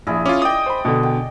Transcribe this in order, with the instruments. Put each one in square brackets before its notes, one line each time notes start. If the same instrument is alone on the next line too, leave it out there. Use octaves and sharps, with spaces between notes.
[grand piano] A#1 [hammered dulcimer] E4 G#4
[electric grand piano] C#4 F4 [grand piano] D6
[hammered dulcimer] D5 D#5 [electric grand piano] G5 D#6
[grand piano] C5 B5
B2 D3
[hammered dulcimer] G5